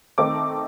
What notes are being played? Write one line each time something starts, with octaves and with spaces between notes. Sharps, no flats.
D#3 A3 C4 D#4 D6